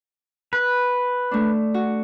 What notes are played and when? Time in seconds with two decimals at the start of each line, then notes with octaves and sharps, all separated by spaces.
0.53 B4
1.31 A3 D4
1.74 F#4